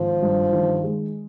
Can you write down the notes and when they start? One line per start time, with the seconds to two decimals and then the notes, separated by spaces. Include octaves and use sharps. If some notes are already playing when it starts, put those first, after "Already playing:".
Already playing: G#1 F3
0.22 G2
0.53 D#3
0.84 G#3